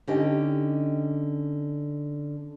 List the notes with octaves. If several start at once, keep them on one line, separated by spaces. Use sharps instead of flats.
D3 C#4 D#4 G4 D#5 G5